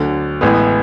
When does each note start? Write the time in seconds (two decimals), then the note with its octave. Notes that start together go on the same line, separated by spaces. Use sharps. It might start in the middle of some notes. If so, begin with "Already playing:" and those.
Already playing: D2 D3 F#3
0.41 A1 A2 G#3 B3